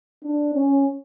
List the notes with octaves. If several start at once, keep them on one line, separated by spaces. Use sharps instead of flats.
D4
C#4